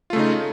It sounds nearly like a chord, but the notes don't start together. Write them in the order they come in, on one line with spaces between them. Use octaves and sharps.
F4 A3 C#3 D#4